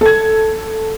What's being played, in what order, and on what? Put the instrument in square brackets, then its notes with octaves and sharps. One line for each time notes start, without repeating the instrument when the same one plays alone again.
[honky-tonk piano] A4 G#6